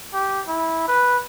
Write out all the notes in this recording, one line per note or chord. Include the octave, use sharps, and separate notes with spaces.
G4
E4
B4